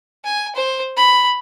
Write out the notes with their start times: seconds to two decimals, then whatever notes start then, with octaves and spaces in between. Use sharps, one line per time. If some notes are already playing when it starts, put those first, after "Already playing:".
0.25 G#5
0.55 C5
0.97 B5